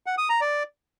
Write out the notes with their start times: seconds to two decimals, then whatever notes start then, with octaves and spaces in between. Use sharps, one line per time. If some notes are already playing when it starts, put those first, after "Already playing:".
0.06 F#5
0.18 D#6
0.29 A#5
0.41 D5